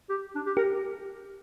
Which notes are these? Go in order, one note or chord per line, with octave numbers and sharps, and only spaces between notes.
G4
D4
G4
G4 A#4